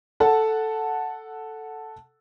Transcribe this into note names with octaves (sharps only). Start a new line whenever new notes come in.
A4 F#5 A5